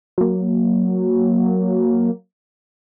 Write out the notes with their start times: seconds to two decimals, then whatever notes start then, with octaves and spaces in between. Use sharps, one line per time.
0.18 F#3 A#3